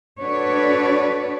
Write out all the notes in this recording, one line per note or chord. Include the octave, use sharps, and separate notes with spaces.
D4 F#4 A4 B4 C#5 D5